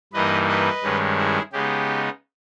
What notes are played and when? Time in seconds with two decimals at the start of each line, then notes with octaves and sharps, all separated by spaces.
0.13 G2 E3 A#3 D#4 B4 D#5
0.48 B4 D#5
0.82 G2 D#3 G#3 C#4
1.17 E4 G#4
1.53 C#3 G#3 B3 D#4 G4